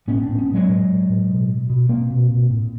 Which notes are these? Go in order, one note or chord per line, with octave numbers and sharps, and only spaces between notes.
A2 B3 C#4
C4 D4
A2
B3 C#4
A2
F#3 G#3
A2
A2
A2
B2
B2
B2
B2 A#3 C4
B2
B2
A2